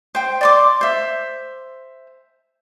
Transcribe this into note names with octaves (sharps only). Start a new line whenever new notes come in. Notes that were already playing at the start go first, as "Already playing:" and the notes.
C5 G5
D5 C6 D6
C5 E5